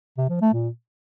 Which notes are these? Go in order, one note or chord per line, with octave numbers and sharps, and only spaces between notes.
C3
F3
A3
A#2